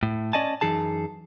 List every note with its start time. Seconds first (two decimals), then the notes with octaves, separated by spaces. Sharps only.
0.03 A2
0.33 C#4 D5 D#5 G#5 A5
0.61 F#2 E3 D#4 G#4 A5